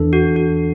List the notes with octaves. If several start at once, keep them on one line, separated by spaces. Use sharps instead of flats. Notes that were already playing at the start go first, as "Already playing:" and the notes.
Already playing: E2 E3 D4 A4
F#4
F#4